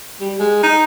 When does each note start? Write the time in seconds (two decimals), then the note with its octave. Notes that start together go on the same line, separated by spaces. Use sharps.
0.21 G3
0.39 G#3
0.63 D#4